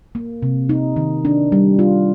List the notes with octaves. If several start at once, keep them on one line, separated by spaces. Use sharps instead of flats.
A#3
C3
D#4
D#3
D4
G3
F4